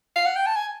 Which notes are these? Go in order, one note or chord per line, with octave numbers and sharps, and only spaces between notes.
F5
F#5
G5
A5
G#5